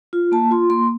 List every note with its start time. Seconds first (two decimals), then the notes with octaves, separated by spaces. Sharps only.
0.13 F4
0.32 A#3 A5
0.51 F4 C6
0.70 A#3 C6